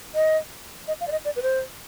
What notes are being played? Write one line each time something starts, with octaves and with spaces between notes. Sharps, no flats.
D#5
D#5
F5
D5
D#5
D5
B4
C5